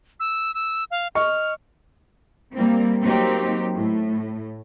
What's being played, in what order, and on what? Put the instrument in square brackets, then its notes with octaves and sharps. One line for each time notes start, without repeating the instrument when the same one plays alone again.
[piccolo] E6
E6
F5
[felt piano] D#5 C#6 [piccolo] F6
[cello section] G3 A#3 C4
F#3 A#3 C4 D#4 G4
A2